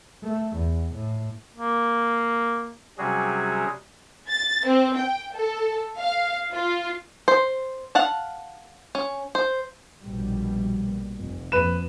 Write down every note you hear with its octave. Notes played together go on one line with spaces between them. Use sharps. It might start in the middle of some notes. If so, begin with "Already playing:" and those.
A3
E2
A2
A#3
C3 F#3 G3 C#4 F#4 G#4
A6
C4
G5
A4
F5
F4
C5
F5 F#5 A5
C#4
C5
A#1 B2 G3
F1
F2 B4 E7